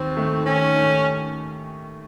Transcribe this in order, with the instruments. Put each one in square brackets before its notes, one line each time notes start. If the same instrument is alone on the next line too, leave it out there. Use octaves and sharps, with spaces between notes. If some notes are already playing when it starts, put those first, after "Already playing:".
Already playing: [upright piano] D#2 [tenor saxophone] C4
[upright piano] D#3 A3
[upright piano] D#2 [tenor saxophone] C#4
[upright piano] D#3 A3